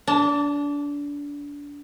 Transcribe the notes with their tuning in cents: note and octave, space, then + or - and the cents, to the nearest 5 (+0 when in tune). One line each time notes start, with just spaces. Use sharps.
D4 -25 A5 +20